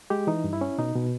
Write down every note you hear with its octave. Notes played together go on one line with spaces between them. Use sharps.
G#3 G4
E3 D#4
G2
E4
C#4
B2 D#4
B2